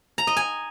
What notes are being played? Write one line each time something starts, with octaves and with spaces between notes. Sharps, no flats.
A#5
D#5
G#5